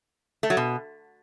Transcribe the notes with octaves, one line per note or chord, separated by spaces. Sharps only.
A3
F#3
B2